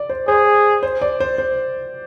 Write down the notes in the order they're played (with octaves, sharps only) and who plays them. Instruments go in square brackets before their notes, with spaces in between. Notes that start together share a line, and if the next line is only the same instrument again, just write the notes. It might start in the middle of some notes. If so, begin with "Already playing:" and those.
Already playing: [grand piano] D5
C5
[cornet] G#4 [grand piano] C5
[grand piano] C5
D5
C5
C5